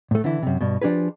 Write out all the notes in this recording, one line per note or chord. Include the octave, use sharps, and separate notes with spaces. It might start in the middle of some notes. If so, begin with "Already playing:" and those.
A2 A3
D3 E3 E4
F#2 C3
G2 B2
F3 D4 G4 G#4 B4